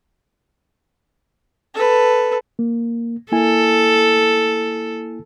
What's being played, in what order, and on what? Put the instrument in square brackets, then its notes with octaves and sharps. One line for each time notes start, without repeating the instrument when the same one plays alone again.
[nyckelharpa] A4 B4
[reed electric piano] A#3
[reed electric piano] A#3 E4 G#5 [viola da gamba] A4